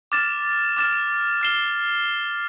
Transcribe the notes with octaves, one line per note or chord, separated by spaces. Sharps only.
D6 F6 A6 E7
D6 F6 A6 E7
F6 C7 E7 G7